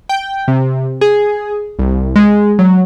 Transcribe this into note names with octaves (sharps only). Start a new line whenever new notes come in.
G5
C3
G#4
C2
G#3
F#3